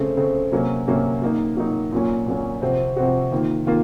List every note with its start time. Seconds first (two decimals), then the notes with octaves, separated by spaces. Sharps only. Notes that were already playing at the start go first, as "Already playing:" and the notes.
Already playing: C#3 A3 C4
0.17 C#3 A3 C4
0.52 C3 F#3 A#3 C#4
0.88 C3 F#3 A#3 C#4
1.22 F#3 A#3 D#4
1.57 F#3 A#3 D#4
1.91 A#2 F#3 A#3 C#4
2.26 A#2 F#3 A#3 C#4
2.62 C3 F3 C4 F#4
2.96 C3 F3 C4 F#4
3.32 D#3 A#3 F4
3.66 D#3 A#3 F4